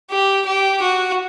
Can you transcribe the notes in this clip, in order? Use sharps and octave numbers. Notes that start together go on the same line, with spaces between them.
G4
G4
F#4